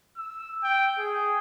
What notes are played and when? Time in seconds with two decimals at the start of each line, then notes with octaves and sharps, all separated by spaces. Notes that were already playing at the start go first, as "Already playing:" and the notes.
0.17 E6
0.64 G5
0.99 G#4